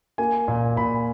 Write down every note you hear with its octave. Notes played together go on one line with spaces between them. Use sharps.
A#3 G#5
A#2
A#2 B5